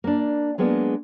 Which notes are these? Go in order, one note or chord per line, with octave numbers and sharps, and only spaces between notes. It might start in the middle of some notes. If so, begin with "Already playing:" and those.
A#3 D4
F#3 G#3 A#3 B3 D4